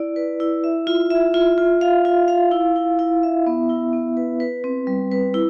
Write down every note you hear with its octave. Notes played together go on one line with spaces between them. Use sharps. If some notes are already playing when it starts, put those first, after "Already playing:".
Already playing: E4 D5
B4
E4
E5
F4
E5
F4
F4
F5
F4
F5
E4
E4
E4
E5
B3
E4
B3
B4
B4
C4
G3
B4
E4